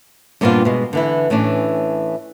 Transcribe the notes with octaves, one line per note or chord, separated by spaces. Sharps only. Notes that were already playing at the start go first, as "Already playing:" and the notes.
G2 A#2 B3 C4 D4 F4
B2 G#3
D3 E3 E4
A2 E3 C#4 D4